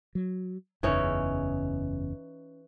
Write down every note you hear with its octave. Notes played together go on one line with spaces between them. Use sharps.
F#3
F#1 E2 C#3 E3 C#4 D#4